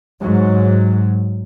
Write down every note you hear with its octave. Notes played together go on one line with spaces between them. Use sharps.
G#2 F#3